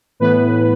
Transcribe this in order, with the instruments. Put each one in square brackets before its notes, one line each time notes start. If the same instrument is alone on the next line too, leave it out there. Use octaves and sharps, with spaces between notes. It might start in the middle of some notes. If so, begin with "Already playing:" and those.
[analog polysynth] A2 E3 B3 B4